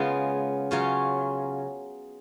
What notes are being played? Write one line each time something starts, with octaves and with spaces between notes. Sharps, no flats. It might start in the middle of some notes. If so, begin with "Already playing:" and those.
Already playing: C#3 G#3 B3 F4
C#3 F#3 C#4 F4